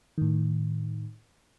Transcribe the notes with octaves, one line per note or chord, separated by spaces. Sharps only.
A2 D#3